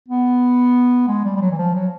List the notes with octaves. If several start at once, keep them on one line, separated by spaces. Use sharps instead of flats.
B3
G#3
G3
G3
F#3
E3
F3
F#3